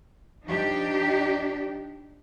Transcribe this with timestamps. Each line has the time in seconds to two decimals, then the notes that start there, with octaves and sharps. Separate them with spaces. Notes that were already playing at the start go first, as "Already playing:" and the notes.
0.46 F3 D4 D#4 G4